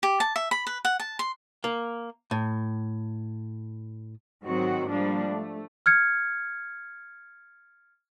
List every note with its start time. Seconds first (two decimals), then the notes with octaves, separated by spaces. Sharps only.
0.03 G4
0.20 A5
0.36 E5
0.51 B5
0.67 B4
0.85 F#5
1.00 A5
1.19 C6
1.64 A#3
2.31 A2
4.45 G#2 D#3 F#3 C4 F#4
4.89 F3 G3 A#3 D4
5.28 A3
5.86 F6 G#6 C#7